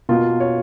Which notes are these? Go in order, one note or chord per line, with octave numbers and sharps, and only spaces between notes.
B2 A#3 F4
C#5